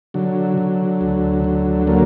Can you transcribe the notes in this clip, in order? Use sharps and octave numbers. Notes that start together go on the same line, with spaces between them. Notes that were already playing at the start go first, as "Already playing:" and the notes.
D3 F#3
D3
D2
D3
F#3 A#3